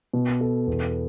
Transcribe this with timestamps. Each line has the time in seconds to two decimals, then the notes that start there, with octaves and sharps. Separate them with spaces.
0.13 B2
0.41 A4
0.67 E2